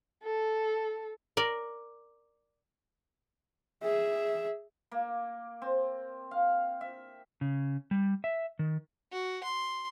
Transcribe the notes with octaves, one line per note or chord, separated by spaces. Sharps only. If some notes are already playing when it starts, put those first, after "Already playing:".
A4
A#4 D5
G#4 E5
A#3
C4
F5
E5
C#3
G3
E5
D#3
F#4
C6